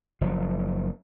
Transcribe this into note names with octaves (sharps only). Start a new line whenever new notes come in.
F#1 F3